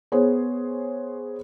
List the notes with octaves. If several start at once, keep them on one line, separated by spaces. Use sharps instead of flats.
B3 G#4 C5 C#5